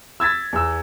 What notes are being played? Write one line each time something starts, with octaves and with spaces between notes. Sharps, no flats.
E6 G#6 A6 B6
E2 E6